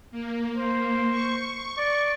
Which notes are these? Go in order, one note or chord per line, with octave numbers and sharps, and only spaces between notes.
A#3
C5
C#6
D5